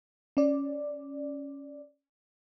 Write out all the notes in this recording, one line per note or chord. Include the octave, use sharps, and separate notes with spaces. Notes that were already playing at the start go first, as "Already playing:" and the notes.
C#4 D5